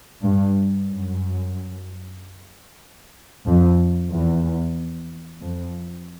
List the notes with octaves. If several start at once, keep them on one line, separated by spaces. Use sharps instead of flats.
G2
F#2
F2
E2
F2